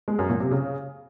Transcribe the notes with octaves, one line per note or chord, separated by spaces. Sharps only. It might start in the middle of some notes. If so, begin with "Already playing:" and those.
G#3
F#2
A#2
C3
C#3